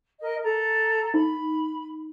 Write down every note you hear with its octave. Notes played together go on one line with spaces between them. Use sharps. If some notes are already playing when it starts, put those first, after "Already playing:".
A#4 D#5
A4 A#5
D#4 B5